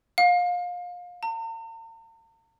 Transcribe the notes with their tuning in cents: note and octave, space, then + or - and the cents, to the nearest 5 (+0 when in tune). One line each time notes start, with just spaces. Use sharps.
F5 +30
A#5 -45